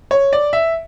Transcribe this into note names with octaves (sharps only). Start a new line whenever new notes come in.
C#5
D5
E5